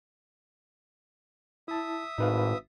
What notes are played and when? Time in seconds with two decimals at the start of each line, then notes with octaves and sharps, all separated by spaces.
1.68 E4 E5 A5 D#6
2.18 G#1 A2 D#4 B4 F5